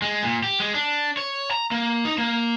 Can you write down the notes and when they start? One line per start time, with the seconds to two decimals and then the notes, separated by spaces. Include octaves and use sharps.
0.02 G#3
0.23 A#2
0.44 G4
0.60 G#3
0.74 D4
1.17 C#5
1.51 A#5
1.71 A#3
2.05 D#4
2.18 A#3